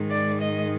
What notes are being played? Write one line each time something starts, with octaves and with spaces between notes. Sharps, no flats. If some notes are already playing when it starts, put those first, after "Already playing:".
Already playing: G#2 D#3 G#3
D5
D#5